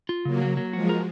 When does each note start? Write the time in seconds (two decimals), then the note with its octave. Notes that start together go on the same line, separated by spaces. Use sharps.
0.09 F4
0.25 C#3 F#3 A#3
0.42 F#3
0.57 F#3
0.73 F3 G#3 F#4
0.89 A#4